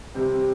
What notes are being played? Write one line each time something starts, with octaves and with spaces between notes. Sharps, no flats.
C3 G3 C4